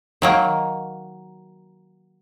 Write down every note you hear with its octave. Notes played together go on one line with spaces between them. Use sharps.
D#3 F#3 A#3